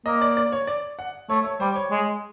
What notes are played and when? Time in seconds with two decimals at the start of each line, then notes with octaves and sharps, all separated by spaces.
0.06 A#3 D#5
0.21 D5
0.37 D5
0.52 C#5
0.67 D5
0.99 F#5
1.29 A3 C#5
1.45 C#5
1.60 G3 C5
1.76 C#5
1.91 G#3